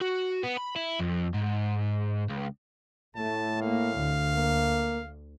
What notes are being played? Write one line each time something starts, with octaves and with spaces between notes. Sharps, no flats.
F#4
B3
B5
E4
F2
G#2
C#2
A2 A3 A5
A#3 F5
D2
A#3